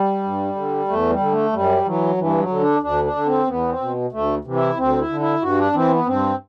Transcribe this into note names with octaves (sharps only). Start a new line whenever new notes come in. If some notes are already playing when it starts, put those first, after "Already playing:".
Already playing: G3
G2
D3
E2 A3
G3
D3
A3
F#2 G3
E3 F#3
G2 E3
F#3
D3
D4
D2 D4
D4
D3
C4
E2 B3
C4
B2
D2 A3
C3 E3
E4
D2 C4
E4
D3
E4
G2 F#4
D4
E3 C4
B3
G2 C4